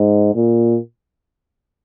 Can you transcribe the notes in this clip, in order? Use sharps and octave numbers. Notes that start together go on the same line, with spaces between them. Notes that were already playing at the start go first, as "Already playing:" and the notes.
Already playing: G#2
A#2